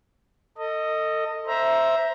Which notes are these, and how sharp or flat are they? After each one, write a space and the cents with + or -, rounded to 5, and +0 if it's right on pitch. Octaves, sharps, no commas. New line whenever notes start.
A4 +35 D#5 +0
C5 +0 E5 +0 A#5 +15